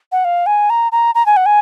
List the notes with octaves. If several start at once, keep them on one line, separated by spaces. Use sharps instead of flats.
F#5
F5
G#5
A#5
A#5
A#5
G#5
F#5
G#5